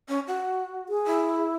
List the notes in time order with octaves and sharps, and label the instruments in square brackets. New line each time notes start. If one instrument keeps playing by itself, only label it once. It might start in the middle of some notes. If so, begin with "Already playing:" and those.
[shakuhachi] C#4
F#4
[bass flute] G#4
[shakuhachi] E4